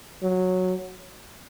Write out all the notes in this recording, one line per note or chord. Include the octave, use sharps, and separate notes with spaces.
F#3